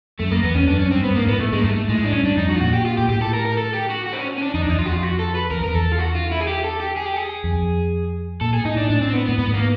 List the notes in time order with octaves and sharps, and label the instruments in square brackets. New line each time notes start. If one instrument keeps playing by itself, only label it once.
[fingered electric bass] F#2 [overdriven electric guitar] A3
[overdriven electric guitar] A#3
[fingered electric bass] E2 [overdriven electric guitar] B3
[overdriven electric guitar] C#4
[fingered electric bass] F#2 [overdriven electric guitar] D4
[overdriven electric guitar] C#4
[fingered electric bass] G2
[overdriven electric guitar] C4
[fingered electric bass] G2 [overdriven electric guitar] B3
[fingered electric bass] G#2 [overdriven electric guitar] A#3
[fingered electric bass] A2 [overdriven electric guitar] B3
[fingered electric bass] G#2 [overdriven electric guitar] A3
[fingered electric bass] G2 [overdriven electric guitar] G#3
[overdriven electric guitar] A#3
[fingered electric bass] G#2 [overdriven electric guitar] A3
[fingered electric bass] A2 [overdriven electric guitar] G#3
[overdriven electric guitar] D4
[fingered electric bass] G2 [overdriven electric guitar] C#4
[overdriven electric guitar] D4
[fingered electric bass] F2 [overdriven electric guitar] D#4
[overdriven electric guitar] F#4
F4
[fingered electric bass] A#2 [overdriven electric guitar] F#4
[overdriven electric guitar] G4
F4
[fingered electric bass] A#2 [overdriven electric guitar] G4
[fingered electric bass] A2 [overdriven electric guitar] G4
[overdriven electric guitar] A4
A#4
A#4
A4
G4
F#4
F#4
C4
C#4
C#4
D4
[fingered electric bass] F2 [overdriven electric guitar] D#4
[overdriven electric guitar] D4
[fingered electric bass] E2 [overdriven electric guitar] D#4
[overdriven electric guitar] F4
[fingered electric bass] F2 [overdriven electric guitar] F#4
[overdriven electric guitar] F4
F#4
A4
B4
[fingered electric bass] E2 [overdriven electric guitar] A#4
[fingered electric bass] F2
[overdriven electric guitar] A#4
[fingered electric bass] E2
[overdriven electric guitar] A4
F4
F#4
F4
E4
G#4
G4
A4
G4
G#4
G4
G#4
[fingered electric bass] F2
[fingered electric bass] A#2 [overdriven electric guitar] A4
[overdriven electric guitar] G#4
[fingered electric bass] A2 [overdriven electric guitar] D#4
[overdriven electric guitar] D4
[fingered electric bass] A2 [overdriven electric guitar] D4
[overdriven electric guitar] C4
B3
[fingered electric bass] A2 [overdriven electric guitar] B3
[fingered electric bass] G#2 [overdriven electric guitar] B3
[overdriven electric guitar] A#3